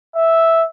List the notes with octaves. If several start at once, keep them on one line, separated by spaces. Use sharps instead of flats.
E5